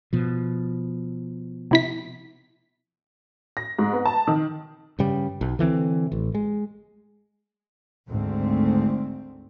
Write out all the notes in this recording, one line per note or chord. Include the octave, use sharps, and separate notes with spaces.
B2 F3
C3 E4 B6
A#6
G#2
B3
A5
D#3
G2 C#3 G3
B1
D3 E3 A3 C4
A1
G#3
G#1 D2 G#2 A3 C4